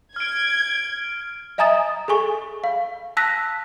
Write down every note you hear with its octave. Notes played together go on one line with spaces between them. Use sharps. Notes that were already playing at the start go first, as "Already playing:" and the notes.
F6 G#6 D7
D#5 E5 G#5 A#5 D#6 A6
G#4 A4 G#5 C#6
F5
A5 E6 F#6 A#6 B6